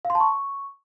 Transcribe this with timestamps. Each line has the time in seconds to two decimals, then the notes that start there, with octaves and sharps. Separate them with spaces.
0.05 F5
0.10 C6
0.15 A5
0.20 C#6